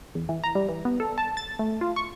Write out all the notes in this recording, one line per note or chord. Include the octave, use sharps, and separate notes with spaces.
E2
E3
A#5
G3
E3
B3
A4
A5
A6
A3
F4
C#6